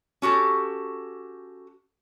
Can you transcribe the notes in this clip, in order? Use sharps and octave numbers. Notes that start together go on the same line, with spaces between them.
C#4 F#4 G4 A4